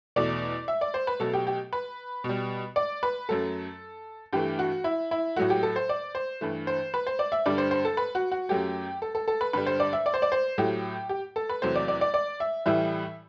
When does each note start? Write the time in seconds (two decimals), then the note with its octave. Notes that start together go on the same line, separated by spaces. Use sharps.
0.16 E2 B2 A3 D5
0.68 E5
0.81 D5
0.94 C5
1.07 B4
1.20 B2 F#3 A3 A4
1.33 G4
1.47 G4
1.73 B4
2.24 B2 G3
2.76 D5
3.03 B4
3.29 F#2 F#3 A3 A4
4.33 G2 E3 A3 G4
4.59 F#4
4.84 E4
5.11 E4
5.36 A2 F#3 A3 F#4
5.50 G4
5.63 A4
5.76 C5
5.89 D5
6.15 C5
6.41 G2 E3 A3
6.67 C5
6.94 B4
7.07 C5
7.19 D5
7.32 E5
7.46 G2 D3 G3 D5
7.58 C5
7.71 C5
7.85 A4
7.97 B4
8.15 F#4
8.32 F#4
8.49 F#2 F#3 A3 G4
9.02 A4
9.15 A4
9.28 A4
9.41 B4
9.53 G2 D3 G3 B4
9.66 C5
9.80 D5
9.93 E5
10.06 D5
10.14 C5
10.22 D5
10.32 C5
10.58 A2 F#3 A3 G4
11.09 G4
11.36 A4
11.49 B4
11.62 E2 C3 F#3 A3 C5
11.75 D5
11.88 D5
12.01 D5
12.14 D5
12.40 E5
12.66 A2 E3 G3 E5